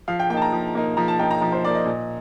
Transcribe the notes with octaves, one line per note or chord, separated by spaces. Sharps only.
F3 F5
G5
A#3 D#4 G5 A5
A#5
F3
A#3 D#4
F3 A#5
A5
A#3 D#4 G5
A#5
F3 A#5
C5
A#3 D#4 D5
D#5
A#2